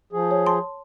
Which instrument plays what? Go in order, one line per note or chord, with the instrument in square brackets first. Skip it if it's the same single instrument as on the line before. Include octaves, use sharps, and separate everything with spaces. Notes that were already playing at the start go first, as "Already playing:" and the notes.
[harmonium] F3 G#4
[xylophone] C#5
A5 C6